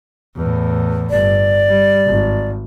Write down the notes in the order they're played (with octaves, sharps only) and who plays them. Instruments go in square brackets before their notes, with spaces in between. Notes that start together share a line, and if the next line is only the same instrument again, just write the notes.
[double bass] E2 A2
[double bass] G1 [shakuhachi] D5
[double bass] G3
G#1